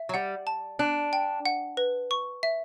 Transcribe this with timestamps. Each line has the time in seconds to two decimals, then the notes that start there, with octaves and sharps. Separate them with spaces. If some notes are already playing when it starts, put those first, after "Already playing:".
Already playing: E5
0.09 F#3
0.14 G3 F#5
0.47 A5
0.79 D4 F#6
1.13 G5
1.46 F#5
1.77 B4
2.11 C#6
2.43 E5